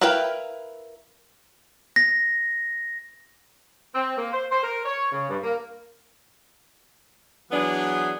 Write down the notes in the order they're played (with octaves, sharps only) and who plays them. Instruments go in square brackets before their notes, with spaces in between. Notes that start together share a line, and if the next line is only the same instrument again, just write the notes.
[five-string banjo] E4 A#4 B4 F5 G5
[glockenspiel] A#6
[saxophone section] C4
A#3
C5
C5
A#4
C#5
C#3
G2
A#3
[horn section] E3 F#3 B3 D4 G#4